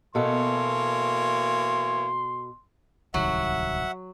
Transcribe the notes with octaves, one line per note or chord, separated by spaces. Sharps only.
B2 E3 A#3 A4 C#5 C6
D1 C2 D#3 F#3 E5 F#5